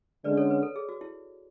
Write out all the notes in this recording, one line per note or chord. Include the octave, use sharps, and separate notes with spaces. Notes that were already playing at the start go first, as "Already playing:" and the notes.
D3 G#3 C#4 B4 D5
A4 C#5
B4
A4
G#4
F#4
E4